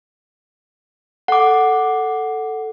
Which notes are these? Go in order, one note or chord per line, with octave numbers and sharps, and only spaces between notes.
A4 F#5 D6